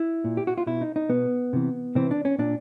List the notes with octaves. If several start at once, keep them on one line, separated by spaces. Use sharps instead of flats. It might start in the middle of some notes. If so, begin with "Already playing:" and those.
Already playing: E4
A#2
G4
F#4
F4
B2 E4
D#4
D#4
B2 B3
C3 E3
C3 E3 C4
D4
C#4
A#2 D4